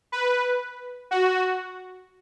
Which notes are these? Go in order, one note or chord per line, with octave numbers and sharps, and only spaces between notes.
B4
F#4